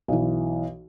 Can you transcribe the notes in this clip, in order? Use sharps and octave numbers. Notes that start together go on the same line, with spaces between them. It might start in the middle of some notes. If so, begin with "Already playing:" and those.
B1 E3